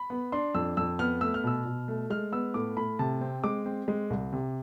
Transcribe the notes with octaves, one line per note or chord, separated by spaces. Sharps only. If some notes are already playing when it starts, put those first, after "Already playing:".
Already playing: B5
B3
D4 C6
F2 E6
F2 E6
B3 F6
A3 E6
F6
B2 E6
B2
A3
G#3 F6
B3 E6
A2 D6
A2 B5
C3 A5
C4
G#3 D6
C4
G#3
C2
C3